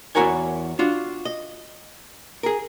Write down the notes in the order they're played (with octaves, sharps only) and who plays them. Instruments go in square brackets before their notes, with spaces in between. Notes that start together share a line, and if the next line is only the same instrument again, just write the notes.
[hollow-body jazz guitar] E2 E4 F#4 A#4 C#5 G#5
D4 F4 F#4
D#5
G#4 A#4